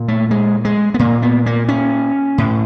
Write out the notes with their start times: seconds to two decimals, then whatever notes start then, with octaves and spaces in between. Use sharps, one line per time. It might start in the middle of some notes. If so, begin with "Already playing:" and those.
Already playing: A#2
0.08 A3
0.31 G#3
0.65 G#3
0.94 B3
0.99 A#2 A#3
1.22 B3
1.46 A#3
1.69 C#4
2.38 A2